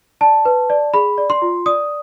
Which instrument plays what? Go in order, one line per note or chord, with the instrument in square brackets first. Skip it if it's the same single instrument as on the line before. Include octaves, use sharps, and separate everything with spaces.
[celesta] D5 A5
B4
D5
G#4 B5
D5
C6
F4
D5 D#6